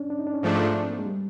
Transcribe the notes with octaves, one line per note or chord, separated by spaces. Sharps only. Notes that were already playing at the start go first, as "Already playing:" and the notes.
Already playing: C#4 D4
D4
D#4
D4
C#4
G#2 F3 A3 D4
D4
C4
A#3
G#3
G3